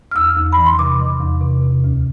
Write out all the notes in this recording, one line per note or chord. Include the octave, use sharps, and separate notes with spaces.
F6
E2 E6
E2
B5
E3
C6
C3 D6
E3
E2
C3
C3
D2